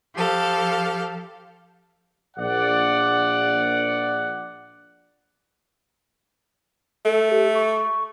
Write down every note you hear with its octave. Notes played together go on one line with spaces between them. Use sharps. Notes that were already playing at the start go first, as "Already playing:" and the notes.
F3 G4 A4 F5
A#1 D5 F#5
A3 A4
G4
C#6